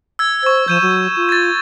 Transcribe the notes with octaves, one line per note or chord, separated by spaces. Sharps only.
E6 G#6
C5 C#6 G#6
F3 G6 D#7 E7
F#3
F4
G#6 A6